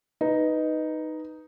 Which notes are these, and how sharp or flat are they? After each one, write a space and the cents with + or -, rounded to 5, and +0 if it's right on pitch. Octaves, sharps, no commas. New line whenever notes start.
D#4 +0 B4 +0